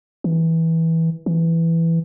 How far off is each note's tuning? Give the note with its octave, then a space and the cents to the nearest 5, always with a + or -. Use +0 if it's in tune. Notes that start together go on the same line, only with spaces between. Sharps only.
E3 -15
E3 +5